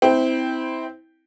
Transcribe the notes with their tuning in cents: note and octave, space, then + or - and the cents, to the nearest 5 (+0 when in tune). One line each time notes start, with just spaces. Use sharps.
C4 -10 E4 -25 G5 +0